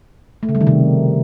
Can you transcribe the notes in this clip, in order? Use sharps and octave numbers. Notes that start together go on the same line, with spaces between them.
A3
C#3
G3
D#3
C3